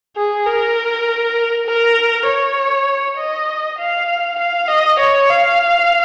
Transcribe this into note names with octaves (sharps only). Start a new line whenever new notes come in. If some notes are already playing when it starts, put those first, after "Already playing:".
G#4
A#4
A#4
C#5
D#5
F5
F5
D#5
C#5
F5